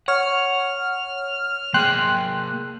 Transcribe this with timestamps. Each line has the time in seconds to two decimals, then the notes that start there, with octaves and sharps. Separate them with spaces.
0.08 C#5 F#5 F6
1.74 A#3 G#4 G5 C6 F#6